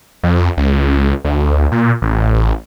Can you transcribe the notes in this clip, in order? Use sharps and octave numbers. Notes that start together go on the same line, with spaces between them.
F2
C#2
D2
A#2
A1